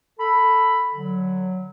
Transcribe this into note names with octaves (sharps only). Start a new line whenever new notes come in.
A4 B5
D3 F#3